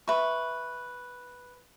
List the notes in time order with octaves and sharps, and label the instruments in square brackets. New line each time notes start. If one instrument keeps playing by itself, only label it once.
[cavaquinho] B4 E5 C#6